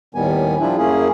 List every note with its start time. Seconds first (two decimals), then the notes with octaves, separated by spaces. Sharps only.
0.15 D#2 A2 D#3 G3 B3 G#5
0.60 F3 G3 D4 E4
0.77 F#2 A#3 C#4 E4 G#4